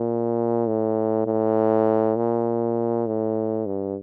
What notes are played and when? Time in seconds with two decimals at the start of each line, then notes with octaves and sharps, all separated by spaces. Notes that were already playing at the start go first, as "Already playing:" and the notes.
Already playing: A#2
0.67 A2
1.26 A2
2.16 A#2
3.07 A2
3.66 G2